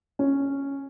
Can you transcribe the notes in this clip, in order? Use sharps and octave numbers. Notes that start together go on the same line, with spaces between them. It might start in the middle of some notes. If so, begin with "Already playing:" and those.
C#4